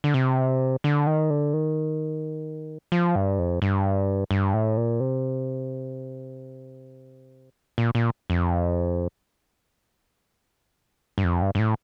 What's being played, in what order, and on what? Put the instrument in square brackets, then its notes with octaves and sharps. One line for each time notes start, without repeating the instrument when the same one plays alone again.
[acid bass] D3
C3
D3
D#3
D3
D#3
F3
G2
F2
G2
G2
A2
A#2
C3
A#2
A#2
F2
G2
F2
G2
G2
A2